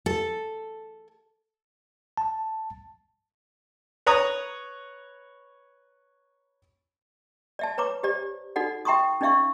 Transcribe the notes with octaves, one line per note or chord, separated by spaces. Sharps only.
A4
A5
B4 C#5 A#5 D#6
D5 E5 A5
B4 C#5 A#5 D6
G4 C5 D5
D#4 F#4 A4 D5 F#5
E5 G5 A#5 C6 C#6 D#6
C#4 D#4 D5 E5 F5 C#6